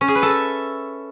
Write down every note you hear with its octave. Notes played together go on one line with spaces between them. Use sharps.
C#4
G#4
B4
A4
E5